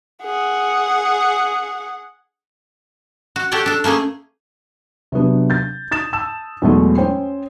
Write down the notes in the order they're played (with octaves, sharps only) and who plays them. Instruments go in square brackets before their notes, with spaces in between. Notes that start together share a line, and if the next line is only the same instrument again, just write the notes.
[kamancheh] G#4 F#5
[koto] F#4
G4 A4 C#5 D5 F#5
D4 A4
A3 A#3 C#4 G#4
[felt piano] C3 F#3 B3 D4
G6 A6
D#6 A6 E7
A5 E6 E7
E2 B2 E3 F#3 G#3 A3
C#4 C5 C#5 G5